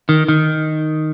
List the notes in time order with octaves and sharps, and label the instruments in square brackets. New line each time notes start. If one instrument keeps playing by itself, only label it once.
[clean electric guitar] D#3
D#3